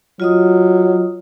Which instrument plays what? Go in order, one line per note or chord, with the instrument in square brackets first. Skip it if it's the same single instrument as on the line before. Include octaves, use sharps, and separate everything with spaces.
[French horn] F#3 [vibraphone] F4 D#5 D#6